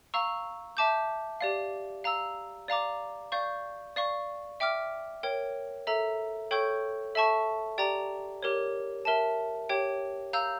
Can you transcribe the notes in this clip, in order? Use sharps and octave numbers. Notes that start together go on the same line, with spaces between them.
F5 A#5 C#6 E6
E5 A5 D6 G6
G4 D5 F5
F5 A#5 E6
D5 F5 A#5 D6
D5 F5 C#6 G6
D5 F5 C#6
E5 G5 D6 F6
A#4 C#5 G5
A4 E5 A#5
A4 C#5 G5 C#6 G6
A4 E5 A5 C#6
G4 D5 G5 A#5
G4 A#4 C#5
A#4 E5 A5
G4 C#5 G5
F5 A#5 E6 G6